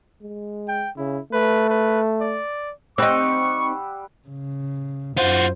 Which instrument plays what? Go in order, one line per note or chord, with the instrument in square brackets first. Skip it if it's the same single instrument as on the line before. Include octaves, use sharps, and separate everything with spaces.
[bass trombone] G#3
[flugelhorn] G5
[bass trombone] C#3 [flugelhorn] E4
[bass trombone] A3 [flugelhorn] B4
[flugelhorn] B4
D5
[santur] G3 F#5 E6 [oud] C4 D#4 [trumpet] C#6
[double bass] C#3
[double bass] F#2 [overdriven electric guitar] F4 F#4 [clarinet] C5